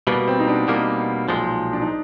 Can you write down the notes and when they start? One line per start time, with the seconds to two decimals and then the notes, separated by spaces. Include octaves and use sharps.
0.07 B2 G3 A#3 B3
0.28 C4
0.39 D#4
0.48 D4
0.68 B2 G3 A#3 D#4
1.28 B1 A#2 F3 G#3
1.73 D4
1.81 D#4